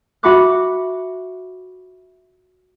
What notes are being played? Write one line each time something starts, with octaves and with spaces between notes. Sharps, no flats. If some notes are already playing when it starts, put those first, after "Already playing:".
F#4 E5 F#5 B5 D6 F#6